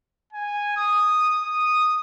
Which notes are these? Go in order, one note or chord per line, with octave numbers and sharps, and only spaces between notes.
G#5
D#6
D#6